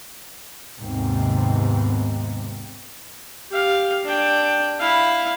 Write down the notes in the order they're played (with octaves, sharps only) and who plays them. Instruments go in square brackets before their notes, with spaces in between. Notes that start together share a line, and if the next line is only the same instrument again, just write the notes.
[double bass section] D#2 G#2 C3 B3 C4
[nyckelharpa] G4 F5
D4 G5
E4 F5